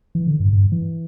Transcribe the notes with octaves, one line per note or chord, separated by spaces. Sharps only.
E3
D3
G2
G2
E3